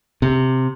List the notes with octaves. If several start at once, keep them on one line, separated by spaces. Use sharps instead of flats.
C3